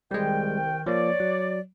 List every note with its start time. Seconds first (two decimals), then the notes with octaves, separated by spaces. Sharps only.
0.11 C2 D#3 G3 G#3 G5
0.86 F3 A#3 C#5 D5
1.20 F#3